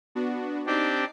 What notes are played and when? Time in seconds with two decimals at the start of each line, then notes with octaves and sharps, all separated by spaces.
0.15 B3 D4 F#4
0.66 C4 D4 D#4 G4 D6 C7